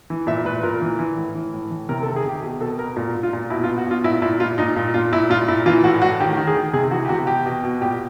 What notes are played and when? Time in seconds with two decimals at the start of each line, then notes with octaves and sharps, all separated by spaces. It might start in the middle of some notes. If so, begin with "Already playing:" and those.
0.10 E3
0.27 A#2 E5
0.45 A#2 B4
0.63 A#2 A#4
0.82 E3
0.99 E3
1.17 A2
1.35 E3
1.54 A2
1.71 E3
1.89 C3 A#4
2.03 A4
2.07 D#3
2.16 G#4
2.25 C3 G4
2.42 B2
2.60 B2 A4
2.78 B2 A#4
2.97 A#2
3.15 A#2
3.23 F4
3.33 A#2
3.50 B2 E4
3.64 F4
3.68 B2
3.78 F#4
3.87 B2 F4
4.04 A#2 E4
4.22 A#2 E4
4.40 A#2 F4
4.58 A#2 D#4
4.76 A#2
4.94 A#2 F4
5.12 A#2 E4
5.30 A#2 F4
5.48 A#2 E4
5.66 E3 F4
5.84 A2 F#4
6.02 A2 F#4
6.20 D#3 G4
6.37 D#3
6.47 G#4
6.56 D#3
6.73 C3 G#4
6.91 E3 F#4
7.05 G4
7.09 C3 F#4
7.27 B2 G4
7.46 B2
7.64 B2
7.81 A#2 G4